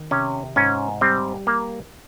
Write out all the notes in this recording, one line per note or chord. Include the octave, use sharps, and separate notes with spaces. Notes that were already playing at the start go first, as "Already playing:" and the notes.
Already playing: D#3
C3 C#4
G#2 C#4
G3 C4
A#3